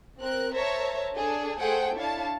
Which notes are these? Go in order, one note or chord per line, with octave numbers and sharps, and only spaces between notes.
C4 A#4 F#6
A#4 C5 C#5 E5 A5 A#5
D4 G#4 A4
A3 G#4 A4 C5 F#5 G5
D4 E4 C#5 F5 A5